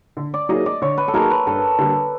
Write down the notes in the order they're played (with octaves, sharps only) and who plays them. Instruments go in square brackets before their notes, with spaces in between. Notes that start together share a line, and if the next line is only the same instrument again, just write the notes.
[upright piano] D3
[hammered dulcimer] D5
[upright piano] F#3 A#3 D#4 G#4 [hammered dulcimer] D#5
[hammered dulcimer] D5
[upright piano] D3 [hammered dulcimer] C#5
[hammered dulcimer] B4
A4
[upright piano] F#3 A#3 D#4 G#4 [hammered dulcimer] A#4
[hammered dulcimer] B4
[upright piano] G2 [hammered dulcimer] A4
[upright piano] D3 G3 A#3